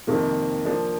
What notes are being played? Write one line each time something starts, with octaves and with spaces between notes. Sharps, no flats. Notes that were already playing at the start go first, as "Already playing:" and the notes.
F2 C3 D#3 A#3
F3 A#3 D4